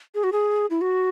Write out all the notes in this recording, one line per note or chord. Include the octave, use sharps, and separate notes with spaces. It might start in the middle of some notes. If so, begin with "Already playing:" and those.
G#4
F#4
G#4
E4
F#4